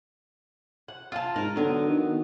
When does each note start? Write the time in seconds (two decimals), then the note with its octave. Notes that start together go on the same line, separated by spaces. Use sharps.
0.88 F#5
1.12 F4 A5
1.36 G#2 A#4
1.56 D3 F#3 B3
1.88 D#3